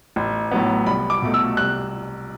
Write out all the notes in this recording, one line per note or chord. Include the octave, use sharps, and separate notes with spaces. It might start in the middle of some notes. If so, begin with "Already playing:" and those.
A1
A2 F#3 B3
C2 B5
D6
B2 A3
E6
C2 F#6